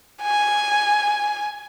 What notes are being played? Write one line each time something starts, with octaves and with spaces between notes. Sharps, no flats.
G#5